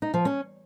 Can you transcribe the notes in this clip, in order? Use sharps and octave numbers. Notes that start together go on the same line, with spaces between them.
D#4
F3
C#4